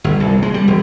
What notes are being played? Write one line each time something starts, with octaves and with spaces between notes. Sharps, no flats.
G1
C2
G#3
G3
E1